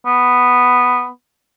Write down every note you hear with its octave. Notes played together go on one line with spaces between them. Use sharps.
B3